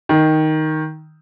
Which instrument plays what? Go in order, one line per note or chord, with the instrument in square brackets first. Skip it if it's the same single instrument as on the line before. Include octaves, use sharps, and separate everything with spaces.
[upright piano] D#3